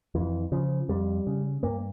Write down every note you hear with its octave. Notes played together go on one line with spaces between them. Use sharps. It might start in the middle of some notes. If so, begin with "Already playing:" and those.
F2 E3
C#3 F3
F2 G3
C#3
G2 A#3